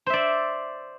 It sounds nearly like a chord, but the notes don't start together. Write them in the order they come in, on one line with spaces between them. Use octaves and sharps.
C5 E5 D5